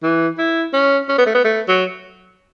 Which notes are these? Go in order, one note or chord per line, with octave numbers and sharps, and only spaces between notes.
E3
E4
C#4
C#4
B3
A3
B3
A3
F#3